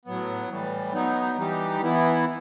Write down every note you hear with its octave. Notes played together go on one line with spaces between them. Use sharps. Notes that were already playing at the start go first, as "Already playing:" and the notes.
A2 F#3 B3
A2 E3 G3
F#3 B3 D#4
E3 G3 D#4 G4
E3 B3 E4